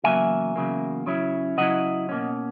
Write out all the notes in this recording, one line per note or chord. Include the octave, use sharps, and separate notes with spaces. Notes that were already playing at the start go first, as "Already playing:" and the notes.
E2 C#3 F#3 A#3 E5 G#5
E2 C#3 F#3 A#3
C#3 F#3 C#4 E4
C#3 F#3 C#4 E4 D#5 F#5
B2 A#3 C#4